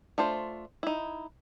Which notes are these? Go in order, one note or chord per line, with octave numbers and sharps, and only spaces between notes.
A3 D4 F4 C5
D#4 E4